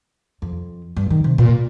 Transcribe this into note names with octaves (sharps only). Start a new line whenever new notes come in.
F2
G2
D#3
C3
A#2